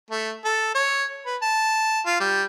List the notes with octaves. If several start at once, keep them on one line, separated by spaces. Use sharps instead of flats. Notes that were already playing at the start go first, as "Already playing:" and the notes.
A3
A4
C#5
B4
A5
F4
G3